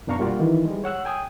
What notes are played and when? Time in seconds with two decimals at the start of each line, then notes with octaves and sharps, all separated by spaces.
0.07 F#2 B2 D4 F5 A#5 C#6
0.19 G3 A#3 F4 F#4 D5
0.40 D#3 E3
0.65 G3 G#3
0.84 C#5 F#5 E6 F#6
1.05 G5 G#5 D#6